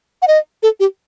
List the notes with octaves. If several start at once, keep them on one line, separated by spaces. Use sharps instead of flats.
F#5
D#5
A4
G4